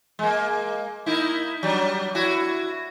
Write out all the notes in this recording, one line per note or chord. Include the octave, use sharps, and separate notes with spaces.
G#3 A#3
A#3 D#4 E4
F#3 G3 D4
E4 F#4